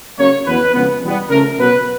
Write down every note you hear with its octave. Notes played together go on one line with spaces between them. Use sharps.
C#3 F#3 A#3 C#5
E2 B2 F#3 B4
F2 C#3 F3 G#3 B3
E2 B2 G3 B3
C#3 F3 A3 A#4
B2 F#3 B3 B4